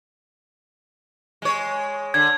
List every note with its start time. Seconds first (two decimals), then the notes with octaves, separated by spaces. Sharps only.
1.42 G#3 C#5
2.14 D3 G#6